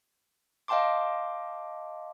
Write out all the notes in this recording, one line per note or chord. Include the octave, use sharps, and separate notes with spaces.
D#5 F5 G5 A5 C6 D6